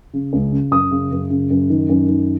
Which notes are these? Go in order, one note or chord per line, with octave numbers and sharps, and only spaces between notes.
C#3
C#2
C#3
F#2 D#6
C#3
F#2
C#3
F#2
D#3
F#2
D#3